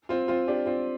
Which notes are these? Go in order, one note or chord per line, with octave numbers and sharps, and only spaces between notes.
C4 F4
C4 F4
D4 G4
C4 F4